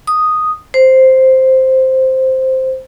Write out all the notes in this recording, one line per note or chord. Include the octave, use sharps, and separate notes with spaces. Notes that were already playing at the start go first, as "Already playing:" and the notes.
D#6
C5